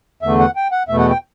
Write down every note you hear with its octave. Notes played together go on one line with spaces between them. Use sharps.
E2 D3 A3 E5
F#5
G5
F#5
E2 B2 A3 E5
F#5
G5